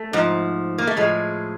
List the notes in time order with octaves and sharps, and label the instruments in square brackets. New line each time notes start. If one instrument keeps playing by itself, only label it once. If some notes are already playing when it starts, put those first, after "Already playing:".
Already playing: [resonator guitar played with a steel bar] A3
G#2 F3
A#3
A3
A2 F3 G#3